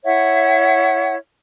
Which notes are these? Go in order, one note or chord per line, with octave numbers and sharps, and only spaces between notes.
E4 C#5 E5 F#5